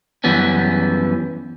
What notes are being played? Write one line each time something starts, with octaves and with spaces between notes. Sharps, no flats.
F#2 E3 G3 B3 C#4